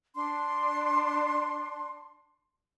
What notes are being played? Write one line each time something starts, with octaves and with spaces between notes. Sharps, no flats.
D4 C6